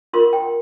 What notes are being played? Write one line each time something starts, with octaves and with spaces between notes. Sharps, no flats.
F4 A#4 C6
G5